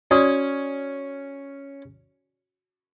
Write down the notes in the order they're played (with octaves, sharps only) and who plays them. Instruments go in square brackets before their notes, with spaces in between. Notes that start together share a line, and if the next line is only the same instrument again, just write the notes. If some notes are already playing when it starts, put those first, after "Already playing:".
[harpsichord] C#4 [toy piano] F#4 D5 D#6